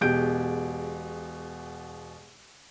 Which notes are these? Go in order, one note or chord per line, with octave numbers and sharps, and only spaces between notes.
E1 B2 G4 G#4 G6 D7